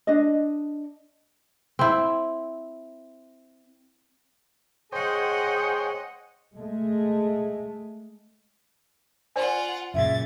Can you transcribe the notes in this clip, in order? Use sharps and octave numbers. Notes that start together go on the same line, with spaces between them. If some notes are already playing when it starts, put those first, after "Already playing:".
D4 D#5
C4 E4
G#4 C5 C#5 D#5 F#5 G5
G#3 A3
F4 C5 D5 F#5 G#5
F#2 A#2 C#3 E5 G#6 A6